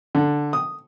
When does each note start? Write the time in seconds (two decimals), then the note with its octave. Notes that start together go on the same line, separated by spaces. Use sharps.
0.15 D3
0.53 D#6